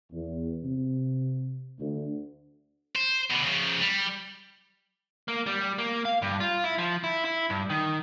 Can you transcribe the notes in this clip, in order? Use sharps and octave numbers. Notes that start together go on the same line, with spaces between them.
E2
C3
D2
C5
B2 D3
C#3 F3
G3
A#3
G3
A#3
F5
G2
F4
E4
F3
E4
E4
G2
D#3